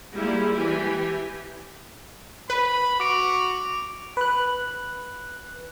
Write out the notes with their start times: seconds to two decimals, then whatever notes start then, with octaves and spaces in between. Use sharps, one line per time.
0.14 G3 G#3 A#3 E4
0.54 E3 G4 G#5
2.50 B4 B5
3.00 F#4 D6 D7
4.17 B4 F#6